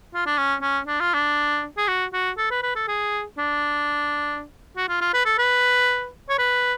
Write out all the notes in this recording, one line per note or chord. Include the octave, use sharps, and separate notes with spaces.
F4
D4
C#4
C#4
D4
F4
D4
G#4
F#4
F#4
A4
B4
B4
A4
G#4
D4
F#4
F4
F4
B4
A4
B4
C#5
B4